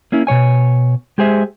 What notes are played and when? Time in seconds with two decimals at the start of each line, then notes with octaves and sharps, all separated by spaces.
0.12 A#3 C#4 E4
0.27 B2 G3 C#5 G#5
1.18 G#3 G4 G#4 C5 E5